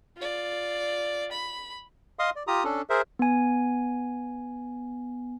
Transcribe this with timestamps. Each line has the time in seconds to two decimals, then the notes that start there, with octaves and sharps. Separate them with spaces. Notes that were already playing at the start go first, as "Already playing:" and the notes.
0.17 F4 D5
1.32 B5
2.19 D#5 F5 C6 D#6
2.36 D5
2.47 F4 G4 A#5 D#6
2.64 C#4 D4 A4
2.90 G#4 A#4 C5 E5
3.19 B3 G#5